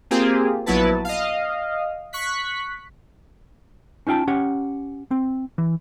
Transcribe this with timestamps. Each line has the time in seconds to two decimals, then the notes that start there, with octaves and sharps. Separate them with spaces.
0.11 A#3 C4 F4 G4 G#4
0.66 A#1 F#3 B3 E4 B4 A5
1.05 D#5 F5
2.13 C#6 F#6 B6
4.07 C#4 D#4 F4 G5 A5
4.27 C#4 G4 F#5
5.11 C4
5.58 E3